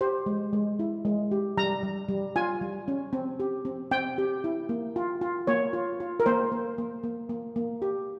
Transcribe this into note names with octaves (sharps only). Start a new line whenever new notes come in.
G4 C5
G#3
G#3
E4
G#3
G4
G3 A#5
G3
G3
F4 G#5
G3
C#4
C4
G4
C4
C4 G5
G4
E4
A#3
F4
F4
A#3 C#5
F4
F4
A#4
A#3 C5
A#3
A#3
A#3
A#3
A#3
G4